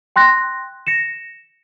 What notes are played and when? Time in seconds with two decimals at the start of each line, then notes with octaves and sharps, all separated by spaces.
0.16 G5 C6 F#6 A#6
0.87 A#6 C#7 E7